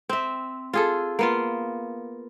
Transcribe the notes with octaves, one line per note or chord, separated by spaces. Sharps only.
C4 E5
F4 G#4 A4
A#3 B3 F4